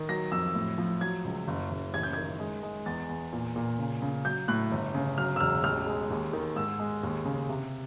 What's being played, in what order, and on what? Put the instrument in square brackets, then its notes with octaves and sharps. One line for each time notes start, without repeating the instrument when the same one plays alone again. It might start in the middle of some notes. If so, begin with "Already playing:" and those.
Already playing: [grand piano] D#3
F#3 A#6
F2 E6
A2
F3
F#3 G#6
C#2
F#1
F#1
A1 G#6
G6
D#3 G#6
G#3
G#3
E2 A6
E2
A#2
A#2
C#3
C#3
F#3 G6
A2 F#6
G1
C#3
F#3 F6
E6
E1 F6
A1 F6
G#3
D#2
D#3
G#2 E6
G#3
D#2
C#3
C3